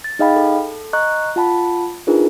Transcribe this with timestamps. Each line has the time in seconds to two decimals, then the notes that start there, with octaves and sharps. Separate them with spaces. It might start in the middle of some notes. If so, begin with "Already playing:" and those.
0.04 A6
0.19 D#4 G#4 D#5 F5 G5 B5
0.36 A4
0.93 D#5 A#5 C#6 F#6
1.36 F4 F#5 A5 B5
2.07 D4 D#4 F4 G#4 A#4 B4